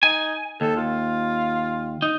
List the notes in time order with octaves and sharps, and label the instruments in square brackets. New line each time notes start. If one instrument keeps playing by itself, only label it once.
[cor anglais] D#4 [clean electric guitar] G#5
[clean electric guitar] D#2 [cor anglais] A4
[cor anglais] F4
[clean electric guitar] D#4